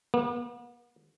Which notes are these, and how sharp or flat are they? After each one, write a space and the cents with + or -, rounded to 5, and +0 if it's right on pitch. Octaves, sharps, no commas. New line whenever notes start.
B3 -45